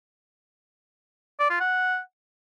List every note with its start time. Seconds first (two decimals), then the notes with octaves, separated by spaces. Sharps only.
1.40 D5
1.50 F4
1.60 F#5